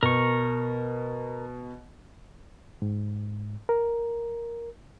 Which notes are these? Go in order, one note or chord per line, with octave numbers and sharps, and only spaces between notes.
B2 A#4 C#6
G#2
A#4